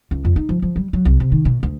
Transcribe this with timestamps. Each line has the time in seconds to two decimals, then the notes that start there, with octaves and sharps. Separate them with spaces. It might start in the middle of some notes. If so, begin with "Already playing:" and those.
0.11 C#2
0.25 F2
0.36 D#4
0.49 F3
0.62 F3
0.76 G3
0.93 F#3
1.05 C2
1.20 C3
1.32 D#3
1.45 B2
1.63 D2